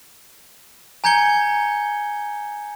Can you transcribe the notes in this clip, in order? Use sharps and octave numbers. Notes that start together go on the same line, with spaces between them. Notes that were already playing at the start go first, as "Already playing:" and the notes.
G#5 A#5 G6 G#6 C#7 G7